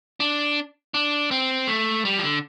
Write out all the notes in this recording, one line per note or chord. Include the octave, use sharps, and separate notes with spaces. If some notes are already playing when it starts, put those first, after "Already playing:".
D4
D4
C4
A3
G3
F3
D3